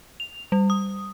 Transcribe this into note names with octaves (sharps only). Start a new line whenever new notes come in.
F7
G3
D#6